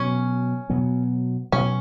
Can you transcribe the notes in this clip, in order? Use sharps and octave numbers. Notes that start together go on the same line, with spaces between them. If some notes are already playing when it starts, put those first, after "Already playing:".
Already playing: B2 F#3 B3 C#4
B2 F#3 B3
B2 F#3 B3 C#4